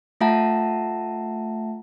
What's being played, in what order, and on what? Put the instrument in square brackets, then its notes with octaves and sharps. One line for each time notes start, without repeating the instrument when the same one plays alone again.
[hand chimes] A3 F4 E5 F#5 A5 A#5